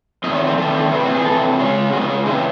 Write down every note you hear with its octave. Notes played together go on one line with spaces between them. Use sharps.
E2 D#3 A3 C4 D#5
C#5
C5
E2 D#3 A3 C4 A4
C3 E3 C4 E4
F#4
G#4
C3 E3 C4 A4
C#3 G#3 C#4
C#3 G#3 C#4 F#4
D#4
C#4
C#3 E3 C4 D#4